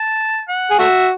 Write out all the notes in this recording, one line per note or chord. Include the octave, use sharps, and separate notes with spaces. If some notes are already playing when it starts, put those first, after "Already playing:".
Already playing: A5
F#5
G#4
A3 F#4 E5